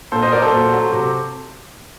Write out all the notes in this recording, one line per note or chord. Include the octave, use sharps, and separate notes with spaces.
A#2 A4 C5
C5 D#5
F#3 A#4 D5
A4 C5
A#2
F#3
C3